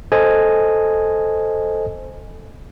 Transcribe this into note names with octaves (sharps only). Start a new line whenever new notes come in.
A4 C5 D#5 G#5